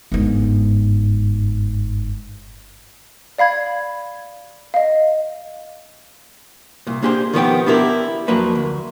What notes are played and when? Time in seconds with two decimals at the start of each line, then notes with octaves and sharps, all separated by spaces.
0.12 G1 G#2
3.38 D5 F5 B5 G#6
4.74 D#5 F5
6.87 C2 A#2
7.03 A#3 D4 G4 G#4 C5
7.33 D#3 F3 A#3 B3 G4 G5
7.66 B3 D4 E4 G4 A#4
8.28 F2 F3 F#3 A#3 B4
8.55 D2